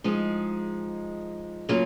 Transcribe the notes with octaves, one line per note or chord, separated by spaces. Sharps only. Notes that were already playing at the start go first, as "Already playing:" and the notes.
F3 G#3 D#4 G#4
C#3 F#3 A#3 F4